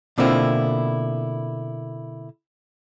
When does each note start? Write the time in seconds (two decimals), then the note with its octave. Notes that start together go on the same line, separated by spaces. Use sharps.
0.18 B2 D3 A#3 C4 E4 F4